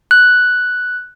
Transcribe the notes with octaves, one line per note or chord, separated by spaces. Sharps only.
F#6